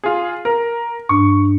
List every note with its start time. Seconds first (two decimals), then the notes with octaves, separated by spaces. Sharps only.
0.04 F4 G#4
0.45 A#4
1.09 G2 C#6